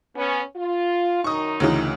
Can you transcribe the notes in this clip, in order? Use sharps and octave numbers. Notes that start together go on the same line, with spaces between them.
B3 C#4
F4
F#2 D#3 D#4 C#6 D#6
D2 C#3 E3